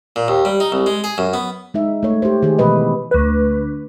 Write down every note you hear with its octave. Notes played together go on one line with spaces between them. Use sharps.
A#2
D#2
G3
D#4
C2
G#3
G#4
F#2
B3
G#3 D#4 E5
A3 C#5
G4 C5
D#3 G4 G#4
B2 E3 G#3 B4 D#5
D2 B4